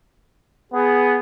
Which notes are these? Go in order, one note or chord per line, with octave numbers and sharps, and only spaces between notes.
B3 G#4